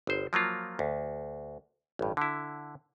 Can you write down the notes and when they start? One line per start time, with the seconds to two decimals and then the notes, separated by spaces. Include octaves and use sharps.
0.07 G1 C5
0.33 F3 F#3 A#3 F4
0.79 D2
1.99 A1 G2
2.17 D3 E4